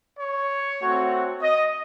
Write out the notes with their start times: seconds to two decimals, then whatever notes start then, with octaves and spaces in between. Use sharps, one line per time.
0.19 C#5
0.81 A3 C4 F#4
1.42 D#5